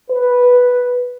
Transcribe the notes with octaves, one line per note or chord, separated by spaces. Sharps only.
B4